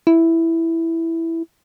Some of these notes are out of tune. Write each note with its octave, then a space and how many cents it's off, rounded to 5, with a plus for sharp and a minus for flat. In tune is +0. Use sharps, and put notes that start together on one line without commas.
E4 +0